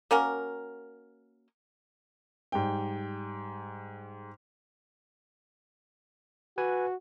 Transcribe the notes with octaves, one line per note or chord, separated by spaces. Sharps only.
A#3 C#4 F#4 A#4
G#2 G3 G5
F#4 B4 G#5